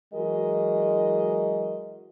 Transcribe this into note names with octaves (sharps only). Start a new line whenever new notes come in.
E3 F#3 G#3 F#4 A#4 D#5